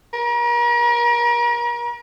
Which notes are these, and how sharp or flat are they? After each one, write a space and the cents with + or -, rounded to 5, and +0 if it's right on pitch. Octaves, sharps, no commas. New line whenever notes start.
A#4 +40